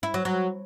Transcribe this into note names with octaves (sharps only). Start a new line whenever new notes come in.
E4
F#3
F#3